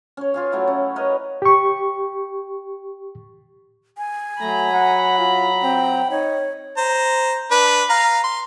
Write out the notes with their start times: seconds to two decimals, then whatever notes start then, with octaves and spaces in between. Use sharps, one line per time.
0.17 C#4 C#5
0.34 F4 G#4 F5
0.52 F#3 A3 E4
0.68 C#4
0.96 A#4 B4 C#5 D#5
1.42 G4 C#6
3.98 G#5
4.40 F#3 A3 A#5 B5
4.73 F#5
5.18 F4
5.62 C4 G5
6.11 D#4 C#5
6.77 C5 A#5
7.51 D4 B4
7.89 F5 A#5
8.23 C6